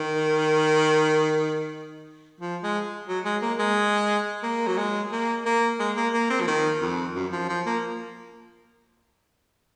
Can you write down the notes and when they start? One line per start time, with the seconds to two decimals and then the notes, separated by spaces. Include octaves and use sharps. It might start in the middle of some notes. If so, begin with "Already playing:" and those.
Already playing: D#3
2.41 F3
2.63 G#3
3.08 F#3
3.25 G#3
3.42 A#3
3.59 G#3
4.43 A#3
4.67 F#3
4.78 G#3
5.12 A#3
5.46 A#3
5.80 G#3
5.97 A#3
6.14 A#3
6.30 C4
6.41 F3
6.47 D#3
6.82 F2
7.15 F#2
7.32 F3
7.49 F3
7.66 A#3